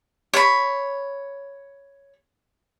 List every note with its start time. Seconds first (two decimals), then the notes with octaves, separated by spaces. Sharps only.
0.33 C#5 B5